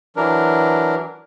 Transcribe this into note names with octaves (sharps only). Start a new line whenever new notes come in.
E3 F#3 D4 A#4